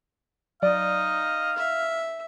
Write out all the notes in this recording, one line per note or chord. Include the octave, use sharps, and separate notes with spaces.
F#3 D#4 D5 D#5 F5
E5